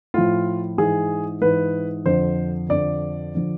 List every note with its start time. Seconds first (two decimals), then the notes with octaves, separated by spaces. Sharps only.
0.14 A2 F3 F4
0.78 G#2 E3 G#4
1.42 G#2 E3 B4
2.05 F2 D3 F3 C5
2.69 F2 D3 F3 D5
3.35 D3 F3